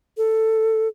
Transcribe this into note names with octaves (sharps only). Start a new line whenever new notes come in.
A4